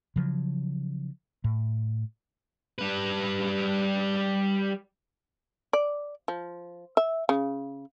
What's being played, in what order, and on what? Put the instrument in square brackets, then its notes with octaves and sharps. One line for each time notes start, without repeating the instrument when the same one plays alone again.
[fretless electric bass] C#3 F3 F#3
A2
[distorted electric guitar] G3 B4
[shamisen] D5
F3
E5
C#3